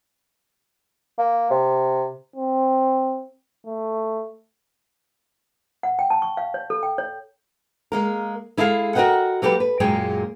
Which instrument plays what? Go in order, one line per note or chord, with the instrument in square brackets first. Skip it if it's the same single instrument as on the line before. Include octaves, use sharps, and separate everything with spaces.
[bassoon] A#3
C3
[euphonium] C4
A3
[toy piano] F#5
G5
A5
C#6
F5
C#5
A4
G5
C#5
[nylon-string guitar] G#3 A#3 A#4
G#3 E4 G#4 A4 B4 F5
F#4 A#4 C5 D#5 F#5 G5
F#3 A#3 G4 A4 B4
B4
F#2 A#2 G#3 A#3 G#4 G5